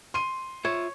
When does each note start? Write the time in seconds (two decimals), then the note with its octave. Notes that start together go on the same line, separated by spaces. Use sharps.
0.14 C6 D#7
0.65 F4 C#5 E5